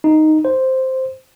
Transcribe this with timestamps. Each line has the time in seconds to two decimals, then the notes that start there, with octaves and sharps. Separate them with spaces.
0.04 D#4
0.45 C5